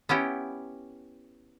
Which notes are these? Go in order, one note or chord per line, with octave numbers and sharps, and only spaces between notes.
B3 C#4 E4 G4